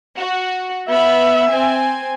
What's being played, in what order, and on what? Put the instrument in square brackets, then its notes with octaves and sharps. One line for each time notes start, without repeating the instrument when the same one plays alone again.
[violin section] F#4
[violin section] B3 B5 [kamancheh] E5
[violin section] C4 G#5